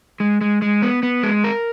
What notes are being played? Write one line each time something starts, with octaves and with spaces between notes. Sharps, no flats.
G#3
G#3
G#3
B3
B3
G#3
A#4